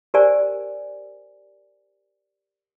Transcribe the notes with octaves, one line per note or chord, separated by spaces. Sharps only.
G4 A#4 C5 D5 G#5